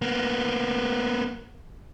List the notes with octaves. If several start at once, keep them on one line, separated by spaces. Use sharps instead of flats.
A#3 B3